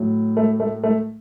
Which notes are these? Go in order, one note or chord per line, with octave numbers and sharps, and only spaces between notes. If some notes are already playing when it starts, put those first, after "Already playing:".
Already playing: A2 F#3
A3
A3
A3